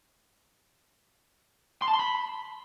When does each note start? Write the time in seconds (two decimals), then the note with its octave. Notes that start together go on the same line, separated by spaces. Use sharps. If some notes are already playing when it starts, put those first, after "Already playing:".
1.82 C6
1.88 A5
1.94 C6
1.99 B5